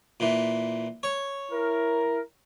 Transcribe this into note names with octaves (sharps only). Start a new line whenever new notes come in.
A#2 E3
C#5
E4 A#4